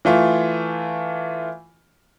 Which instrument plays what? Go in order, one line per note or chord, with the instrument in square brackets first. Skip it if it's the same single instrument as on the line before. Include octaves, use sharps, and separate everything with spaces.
[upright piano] E3 A3 F4